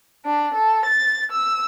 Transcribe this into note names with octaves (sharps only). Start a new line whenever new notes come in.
D4
A4
A6
E6